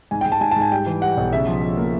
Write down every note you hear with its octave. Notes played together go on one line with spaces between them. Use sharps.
G#2 G#5
G5
G#2
A5
G#2 G#5
A5
G#2
G#5
G3 G5
E3
G3 F#5
B1
C#3 E5
F3
F3
A#3